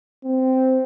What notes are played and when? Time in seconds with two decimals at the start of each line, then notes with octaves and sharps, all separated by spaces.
0.24 C4